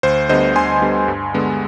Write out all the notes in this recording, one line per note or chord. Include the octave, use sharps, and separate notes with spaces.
D2 C5
D3 G3 B3 C5 D#5
D2 G#5 C6
D3 G3 B3
G2
D3 G#3 B3